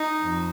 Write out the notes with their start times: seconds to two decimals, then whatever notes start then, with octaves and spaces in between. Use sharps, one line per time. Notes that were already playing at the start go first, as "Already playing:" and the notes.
Already playing: D#4
0.22 F2